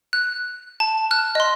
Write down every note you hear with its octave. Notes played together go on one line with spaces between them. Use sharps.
F#6
A5
F6 F#6
D#5 C6